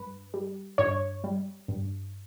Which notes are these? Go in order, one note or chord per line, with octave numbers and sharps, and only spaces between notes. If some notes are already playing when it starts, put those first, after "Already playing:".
Already playing: G2 B4
G3
G2 C#5
G3
G2